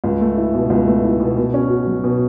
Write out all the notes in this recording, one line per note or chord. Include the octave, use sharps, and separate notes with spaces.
C#2
A3
E4
B2
C#2
A3
E4
B2
B2
C#4
F#4
F#3
B2